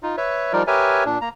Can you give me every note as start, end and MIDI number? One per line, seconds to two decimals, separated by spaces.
0.03 0.16 63
0.03 0.16 65
0.17 0.52 71
0.17 0.52 73
0.17 0.52 76
0.53 0.63 53
0.53 0.63 55
0.53 0.63 63
0.53 0.63 65
0.53 0.63 70
0.53 0.63 74
0.67 1.04 67
0.67 1.04 70
0.67 1.04 71
0.67 1.04 73
0.67 1.04 76
0.67 1.04 80
1.05 1.18 46
1.05 1.18 62
1.21 1.29 58
1.21 1.29 82